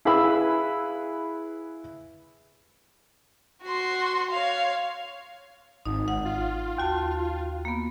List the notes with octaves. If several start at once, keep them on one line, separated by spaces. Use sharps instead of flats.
E4 G#4 B4 F5 B5 E6
F#4 C6
C#5 F5
G#1 D#4
F#5
F4
D#2 F#4 A5
A#3 B3